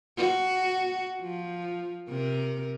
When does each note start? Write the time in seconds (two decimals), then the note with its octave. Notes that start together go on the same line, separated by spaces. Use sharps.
0.17 F#4
1.22 F3
2.09 C3 A#4